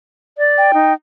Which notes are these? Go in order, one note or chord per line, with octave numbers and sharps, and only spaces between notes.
D5
G5
D#4